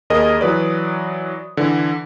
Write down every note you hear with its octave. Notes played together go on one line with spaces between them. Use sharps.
D#2 G#4 A#4 D#5 D#6
E3 F#3 B4 D5
D3 E3